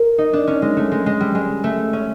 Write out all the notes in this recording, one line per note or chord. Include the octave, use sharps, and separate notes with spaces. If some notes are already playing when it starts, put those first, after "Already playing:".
Already playing: A#4
D#4
D4
C#4
G#3
A3
G#3
G#3
G3
G#3
A3
C#4